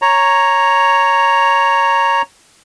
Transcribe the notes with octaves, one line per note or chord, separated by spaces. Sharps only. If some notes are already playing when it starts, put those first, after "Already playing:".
C#5 A#5